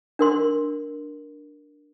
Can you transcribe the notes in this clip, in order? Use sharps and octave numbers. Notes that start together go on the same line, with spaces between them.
D4 A#4 C6